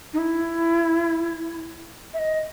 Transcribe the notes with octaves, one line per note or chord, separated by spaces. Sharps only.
D#4
E4
E5
D#5